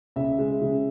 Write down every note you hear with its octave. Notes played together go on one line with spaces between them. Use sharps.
C#2 E5
G#3
C#3